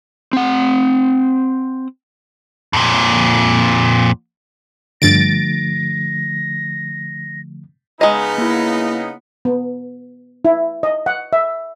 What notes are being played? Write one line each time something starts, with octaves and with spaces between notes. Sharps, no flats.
C4 F#5
F2 A#2
G2 D3 F3 A3 A6 A#6 D7
C#3 G#3 B3 D#4 D#5 A#5
A#3 E4
B3
E4
D#5
F#5
E5